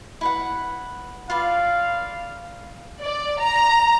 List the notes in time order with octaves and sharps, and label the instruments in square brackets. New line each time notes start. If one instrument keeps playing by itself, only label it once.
[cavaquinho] E4 B4 F#5
[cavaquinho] F4 B4 D5 [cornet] F5
[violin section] D5
A#5